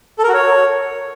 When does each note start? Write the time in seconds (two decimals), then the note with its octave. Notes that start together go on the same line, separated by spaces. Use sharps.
0.18 A4
0.24 A#4
0.29 F#4
0.34 C#5